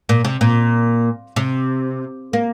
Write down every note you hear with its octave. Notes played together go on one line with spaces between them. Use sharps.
A#2
C3
A#2
C3
A#3